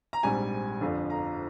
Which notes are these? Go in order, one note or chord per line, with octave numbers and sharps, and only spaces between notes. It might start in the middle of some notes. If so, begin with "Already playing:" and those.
A#5
A#1 G#2 G3 C4 G#5
G1 F2 D3 F3
A#5